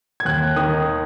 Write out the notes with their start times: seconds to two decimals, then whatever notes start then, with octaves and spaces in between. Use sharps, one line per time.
0.20 G#6
0.25 D#2 F#6
0.56 D#3 D#6